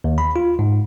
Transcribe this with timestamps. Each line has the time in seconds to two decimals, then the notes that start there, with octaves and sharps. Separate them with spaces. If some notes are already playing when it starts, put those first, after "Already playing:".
0.04 D#2
0.18 B5
0.36 F4
0.59 G#2